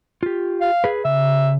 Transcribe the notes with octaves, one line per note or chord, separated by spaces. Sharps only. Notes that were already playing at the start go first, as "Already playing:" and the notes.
F4 G4
F5
G#4 B4
C#3 E5